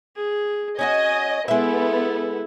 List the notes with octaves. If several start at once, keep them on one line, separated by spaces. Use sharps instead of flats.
G#4
C#4 D#4 F#4 D#5 G#5
G#3 B3 E4 A4 E5